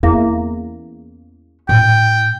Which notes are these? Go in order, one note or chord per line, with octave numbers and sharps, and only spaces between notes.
E2 A#3 C#4
A2 G5